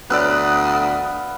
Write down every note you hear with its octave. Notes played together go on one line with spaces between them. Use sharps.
D2 B3 B4 D5 F5 D#6 E6 F#6